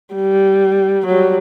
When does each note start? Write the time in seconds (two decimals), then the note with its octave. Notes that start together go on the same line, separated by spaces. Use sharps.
0.15 G3
1.06 F#3 G3